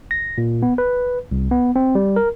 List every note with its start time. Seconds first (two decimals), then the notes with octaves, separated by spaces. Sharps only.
0.11 A#6
0.38 A#2
0.62 B3
0.78 B4
1.32 C2
1.51 B3
1.76 C4
1.95 G3
2.16 A#4